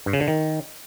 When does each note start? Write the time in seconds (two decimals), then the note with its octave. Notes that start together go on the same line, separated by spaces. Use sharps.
0.06 G2
0.13 C#3
0.21 D3
0.28 D#3